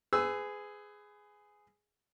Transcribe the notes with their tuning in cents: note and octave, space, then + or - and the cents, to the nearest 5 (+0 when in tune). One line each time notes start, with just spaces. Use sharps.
G#4 +0 B4 +35 E6 +0